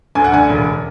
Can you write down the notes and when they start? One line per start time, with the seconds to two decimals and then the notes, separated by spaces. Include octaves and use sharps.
0.15 D2 G#5
0.24 F#5
0.32 D3 G#5
0.49 E1